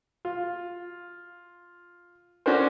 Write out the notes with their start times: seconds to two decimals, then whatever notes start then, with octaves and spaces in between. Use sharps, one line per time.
0.25 F4
2.46 C#4 D4 F#4 A4 A#4 C5